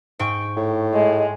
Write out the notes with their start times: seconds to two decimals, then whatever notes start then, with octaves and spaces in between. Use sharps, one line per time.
0.19 G#2 G5 C#6
0.57 A2
0.94 G#3